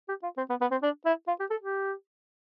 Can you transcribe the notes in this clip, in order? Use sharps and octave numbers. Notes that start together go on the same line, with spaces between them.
G4
F4
C4
B3
B3
C4
D4
E4
F4
G4
A4
G4